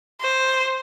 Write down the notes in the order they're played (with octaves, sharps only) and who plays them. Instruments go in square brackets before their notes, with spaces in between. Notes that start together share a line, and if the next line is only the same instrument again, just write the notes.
[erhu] C5